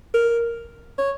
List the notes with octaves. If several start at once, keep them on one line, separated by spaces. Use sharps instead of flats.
A#4
C#5